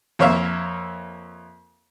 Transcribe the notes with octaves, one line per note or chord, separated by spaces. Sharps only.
F2 A#3 C#5 E5 F5